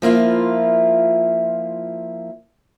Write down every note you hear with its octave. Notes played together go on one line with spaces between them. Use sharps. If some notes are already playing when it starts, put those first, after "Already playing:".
F3 A#3 E4 F4